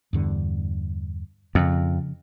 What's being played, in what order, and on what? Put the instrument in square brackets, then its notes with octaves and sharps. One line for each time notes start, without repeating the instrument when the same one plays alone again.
[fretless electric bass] E2 G2 D3
[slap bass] F2 [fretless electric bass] C#3 F3